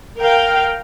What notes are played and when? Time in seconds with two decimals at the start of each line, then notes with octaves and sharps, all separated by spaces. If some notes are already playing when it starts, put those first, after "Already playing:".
0.20 A#4 F5 G5